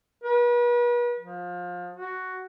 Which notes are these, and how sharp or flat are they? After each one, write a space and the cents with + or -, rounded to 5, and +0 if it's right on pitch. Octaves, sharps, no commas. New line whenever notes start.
B4 -40
F3 +25
F#4 +5